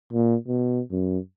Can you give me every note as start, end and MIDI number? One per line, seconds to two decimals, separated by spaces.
0.13 0.35 46
0.47 0.81 47
0.91 1.18 42